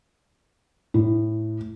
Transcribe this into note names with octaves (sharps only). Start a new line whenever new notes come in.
A2